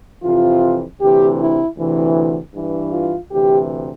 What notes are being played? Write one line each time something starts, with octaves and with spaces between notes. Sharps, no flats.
F2 C3 E3 F4
D2 C3 E3 G4
E4
D2 C3 E3
G2 E3
F4
D2 C3 E3 G4